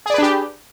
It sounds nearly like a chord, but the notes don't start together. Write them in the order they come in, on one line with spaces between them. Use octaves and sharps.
G#4 D5 B4 D4 G4